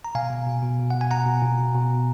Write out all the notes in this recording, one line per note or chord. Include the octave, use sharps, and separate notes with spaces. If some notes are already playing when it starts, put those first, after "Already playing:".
A#5
B2 F5 G#5
B2
B2
B2
B2
B2 F#5
G#5
B2 F#5 A#5
B2
B2
B2
B2
B2